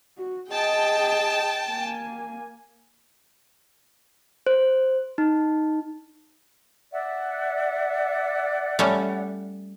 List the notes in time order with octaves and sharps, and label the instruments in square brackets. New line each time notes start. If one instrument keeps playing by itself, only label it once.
[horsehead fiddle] F#4
[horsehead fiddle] G#4 D#5 [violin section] G5 A5
[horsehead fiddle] A#3 G#5
[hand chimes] C5
D#4
[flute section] D5 E5 F#5
[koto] G3 A3 C#4